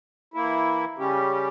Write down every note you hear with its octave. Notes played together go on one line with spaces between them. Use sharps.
E3 A#3 E4
C#3 G3 C#4 G4